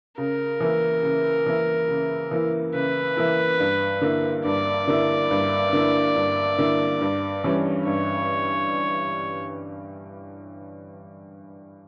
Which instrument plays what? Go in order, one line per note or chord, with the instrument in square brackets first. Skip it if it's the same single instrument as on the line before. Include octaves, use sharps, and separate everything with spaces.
[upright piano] C#3 [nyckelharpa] A#4
[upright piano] E3 A#3 E4
C#3
E3 A#3 E4
C#3
E3 A#3 E4
[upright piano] C#3 [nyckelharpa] B4
[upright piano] E3 A#3 E4
G2
D3 A#3 E4
[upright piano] G2 [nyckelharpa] D5
[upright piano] D3 A#3 E4
G2
D3 A#3 E4
G2
D3 A#3 E4
G2
E3 G3 C#4
[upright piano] G2 [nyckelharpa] C#5